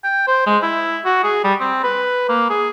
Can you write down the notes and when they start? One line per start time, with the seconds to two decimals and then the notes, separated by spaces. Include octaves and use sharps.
0.04 G5
0.27 C5
0.46 G#3
0.63 E4
1.05 F#4
1.24 G#4
1.44 G3
1.60 C4
1.84 B4
2.29 A#3
2.50 G#4